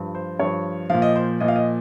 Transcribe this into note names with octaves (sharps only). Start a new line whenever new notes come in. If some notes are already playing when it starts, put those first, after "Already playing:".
Already playing: G2 F3
C5
G2 F3 C#5
A#2 F3 F5
D#5
C5
A#2 F3 D#5
F5
D#5